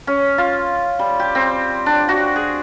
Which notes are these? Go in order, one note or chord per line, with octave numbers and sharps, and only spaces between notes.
C#4
F4
G3
G4
C4
D4
F#4
G#4